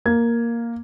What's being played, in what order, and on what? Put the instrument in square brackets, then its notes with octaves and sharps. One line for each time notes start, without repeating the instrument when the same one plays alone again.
[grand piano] A#3 G#6